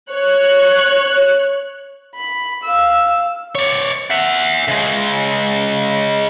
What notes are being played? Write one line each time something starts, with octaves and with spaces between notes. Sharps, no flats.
C#5 F#6
B5
F5 E6
C#5 D5
E5 F#5
C#3 G#3